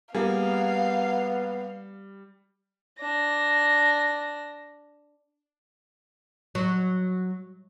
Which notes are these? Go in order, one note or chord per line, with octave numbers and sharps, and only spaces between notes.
G3 A#3 B3 G#4 F5
D4 A#6
F#3